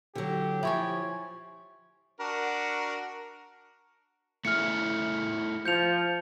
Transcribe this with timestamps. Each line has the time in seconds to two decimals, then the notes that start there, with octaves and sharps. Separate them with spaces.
0.15 D3 F#3 G4
0.63 F3 E4 C#5 G#5
2.20 D4 F#4 A#4
4.45 A3 E4 G#4 F6 C#7
5.65 F3 G6 C#7 F7